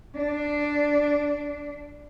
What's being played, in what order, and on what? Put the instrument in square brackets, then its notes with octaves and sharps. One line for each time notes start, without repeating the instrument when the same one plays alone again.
[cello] D4